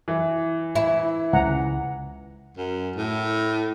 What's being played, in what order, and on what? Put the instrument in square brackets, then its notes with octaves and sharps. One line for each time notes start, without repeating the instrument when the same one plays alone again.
[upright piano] E3
[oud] E4
[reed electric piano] C#2 [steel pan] F#5 A#5
[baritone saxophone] F#2
A2